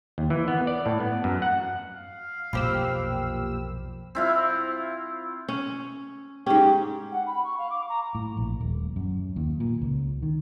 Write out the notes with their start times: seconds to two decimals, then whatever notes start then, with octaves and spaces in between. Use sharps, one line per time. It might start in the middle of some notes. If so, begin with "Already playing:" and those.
0.18 D#2
0.30 E3
0.48 B3
0.67 D5
0.86 A2
1.00 B3
1.24 F#2
1.42 F#5
1.89 F5
2.53 B1 F2 A#2 G4 C5 B5 E6
4.15 C4 E4 F4
5.48 C#4
6.46 G#2 C#4 G4
7.11 F#5
7.26 B5
7.44 C#6
7.58 F5
7.70 D6
7.88 A#5
8.15 A2
8.37 A#1
8.61 D#1
8.96 F#2
9.36 D#2
9.60 A#2
9.81 C#2
10.22 D#3